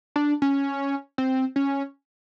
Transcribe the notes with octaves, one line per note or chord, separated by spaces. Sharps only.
D4
C#4
C4
C#4